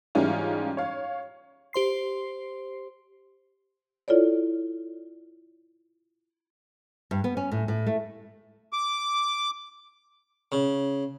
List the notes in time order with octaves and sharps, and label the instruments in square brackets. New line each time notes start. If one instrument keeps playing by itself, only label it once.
[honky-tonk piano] G#2 E3 G3 C#4 D#4 F4
C#5 F5
[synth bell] G4 C5 C6 C7
[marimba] E4 F4 A4 C#5 D5
[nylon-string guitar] G2
B3
C#4
A2
A2
A3
[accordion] D6
[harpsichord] C#3